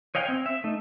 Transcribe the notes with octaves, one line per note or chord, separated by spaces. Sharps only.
C#5 D#5 F5 G5 G#5
C4
E5
A3 D#4